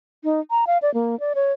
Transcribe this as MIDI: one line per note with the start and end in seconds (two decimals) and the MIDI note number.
0.24 0.40 63
0.51 0.65 82
0.67 0.78 77
0.82 0.93 74
0.94 1.18 58
1.20 1.33 74
1.35 1.52 73